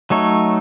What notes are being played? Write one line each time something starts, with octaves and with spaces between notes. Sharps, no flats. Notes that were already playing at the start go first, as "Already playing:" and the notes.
F#3 A3 D#4 A4 C#5